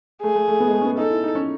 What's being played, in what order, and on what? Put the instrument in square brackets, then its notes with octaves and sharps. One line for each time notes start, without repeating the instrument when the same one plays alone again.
[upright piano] A3 [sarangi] G#4
[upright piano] A3
A3
B3
G#3
A3
C#4
B3
[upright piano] D#4 [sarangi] A4
[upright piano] E4
D#4
C#4